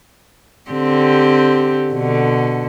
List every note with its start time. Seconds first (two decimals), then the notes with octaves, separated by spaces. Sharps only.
0.71 D3 C4 G4
1.92 B2 D3